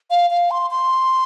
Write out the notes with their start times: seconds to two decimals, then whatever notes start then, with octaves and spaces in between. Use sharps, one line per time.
0.10 F5
0.30 F5
0.51 C6
0.71 C6